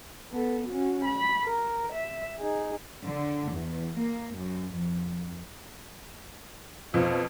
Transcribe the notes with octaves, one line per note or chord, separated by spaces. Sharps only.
B3 A4
C#4 F#4
B5
A#4
E5
D#4 G#4
D3
E2
A#3
F#2
F2
F2 B2 F3